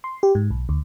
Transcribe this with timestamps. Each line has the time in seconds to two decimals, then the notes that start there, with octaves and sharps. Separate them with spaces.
0.04 C6
0.23 G4
0.35 G#2
0.50 B1
0.69 D2